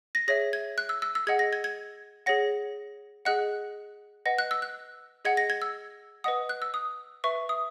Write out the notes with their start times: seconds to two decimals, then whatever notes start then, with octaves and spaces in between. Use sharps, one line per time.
0.15 A#6
0.28 G#4 C#5 E5 A#6
0.53 G#6
0.78 F#6
0.89 E6
1.02 E6
1.15 E6
1.27 G#4 D#5 F#5 G#6
1.39 A#6
1.53 G#6
1.64 G#6
2.26 G#4 C#5 F#5 A#6
3.25 G#4 D#5 F#5 F#6
4.26 B4 D#5 F#5 A#6
4.38 F#6
4.51 E6
4.62 F#6
5.25 G#4 D#5 F#5 G#6
5.37 A#6
5.50 G#6
5.62 E6
6.24 B4 D#5 F#5 D#6
6.49 F#6
6.62 E6
6.74 D#6
7.24 B4 E5 C#6
7.49 D#6